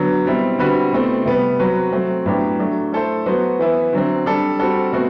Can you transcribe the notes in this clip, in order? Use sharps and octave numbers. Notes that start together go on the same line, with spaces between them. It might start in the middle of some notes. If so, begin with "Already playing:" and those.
Already playing: D3 F#3 B3
B2 G3 C4 E4
D3 G3 C4 F#4 B4
B2 A3 C4 E4
C3 G3 B3
F#3 C4 F#4 B4
F#3 A3 C4
A2 F#3 B3 D4 G4
F#3 A3 D4
A3 E4 A4 C5
F#3 B3 F#4 C5
E3 B3 E4
D3 F#3 C4
G3 D4 A4
G3 C4 F#4 A4
B2 A3 C4 F#4